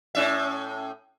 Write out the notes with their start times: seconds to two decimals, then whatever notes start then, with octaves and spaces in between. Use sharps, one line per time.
0.15 A2 C#4 E5